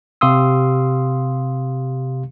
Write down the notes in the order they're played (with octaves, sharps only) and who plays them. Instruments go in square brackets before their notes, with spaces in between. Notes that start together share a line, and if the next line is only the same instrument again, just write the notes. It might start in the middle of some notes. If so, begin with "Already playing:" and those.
[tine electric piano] C3 G4 F5 C6 D#6 E6